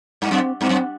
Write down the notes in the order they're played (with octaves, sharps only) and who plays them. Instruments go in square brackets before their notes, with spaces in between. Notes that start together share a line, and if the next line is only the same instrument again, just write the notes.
[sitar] G2
[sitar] F#2 [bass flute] C4
[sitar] G2 [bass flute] C4
[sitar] F#2